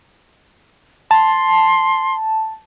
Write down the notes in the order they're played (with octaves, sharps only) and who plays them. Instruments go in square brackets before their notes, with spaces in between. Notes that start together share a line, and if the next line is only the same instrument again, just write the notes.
[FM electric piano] A5 [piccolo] C6